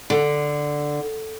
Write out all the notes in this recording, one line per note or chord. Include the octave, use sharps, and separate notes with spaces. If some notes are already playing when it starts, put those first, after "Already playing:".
D3